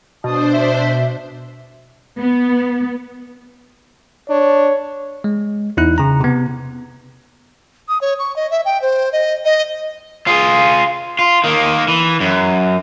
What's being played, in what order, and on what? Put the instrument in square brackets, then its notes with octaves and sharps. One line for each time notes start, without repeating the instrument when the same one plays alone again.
[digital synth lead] B2 [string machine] D4 C5 [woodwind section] A5 D#6
[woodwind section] E5
[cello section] B3
[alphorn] D4 [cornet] C#5
[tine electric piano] G#3
E2 D#4 E4 F#6
C#3 A#5
C3 B3
[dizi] D#6
C#5
C#6
D#5
E5
G5
C5
D#5
D#5
[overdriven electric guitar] F4 G#4
F4
D#3 A#3
E3
F#2